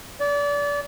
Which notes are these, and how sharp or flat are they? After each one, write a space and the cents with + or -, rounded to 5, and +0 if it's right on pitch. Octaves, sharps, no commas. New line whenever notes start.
D5 -30